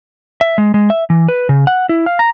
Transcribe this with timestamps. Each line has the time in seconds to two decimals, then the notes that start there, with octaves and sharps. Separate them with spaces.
0.41 E5
0.58 G#3
0.74 G#3
0.90 E5
1.10 E3
1.28 B4
1.49 C#3
1.67 F#5
1.89 E4
2.06 F5
2.19 A#5